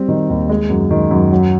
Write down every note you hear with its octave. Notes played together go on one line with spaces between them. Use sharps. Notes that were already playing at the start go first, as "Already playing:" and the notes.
Already playing: G3 C4
D#3
D#2
G#3
F#2
D#3
F#2
F#3